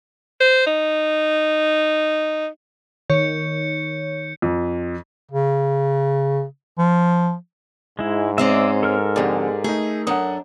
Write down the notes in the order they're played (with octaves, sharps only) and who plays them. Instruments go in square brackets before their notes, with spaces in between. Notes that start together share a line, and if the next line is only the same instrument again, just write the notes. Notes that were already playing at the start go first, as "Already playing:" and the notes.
[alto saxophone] C5
D#4
[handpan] D#3 [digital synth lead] C#5 [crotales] G6 C#7
[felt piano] F2
[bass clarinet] C#3
F3
[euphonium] G#2 [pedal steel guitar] G#3 E4
[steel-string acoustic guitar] G#3 C4 C#4 [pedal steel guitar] D5 E5
[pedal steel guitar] A4 A#4 F6
[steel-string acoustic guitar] F2 D3 [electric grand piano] G4 G#4 D5
[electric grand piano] A3 D#4 [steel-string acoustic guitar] G#4
[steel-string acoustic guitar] F#2 D4 [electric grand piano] F#5 D#6